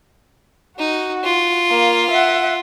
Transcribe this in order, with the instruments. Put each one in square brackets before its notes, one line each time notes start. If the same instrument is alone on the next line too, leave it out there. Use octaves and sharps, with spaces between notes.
[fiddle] D#4 [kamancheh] F#4
[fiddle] F4
[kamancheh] A#3
E5 F#5